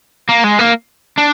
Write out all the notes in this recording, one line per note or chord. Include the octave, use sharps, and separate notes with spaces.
A#3
G#3
A#3
D4